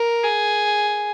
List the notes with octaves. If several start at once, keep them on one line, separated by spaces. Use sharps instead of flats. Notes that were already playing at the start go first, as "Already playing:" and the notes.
Already playing: A#4
G#4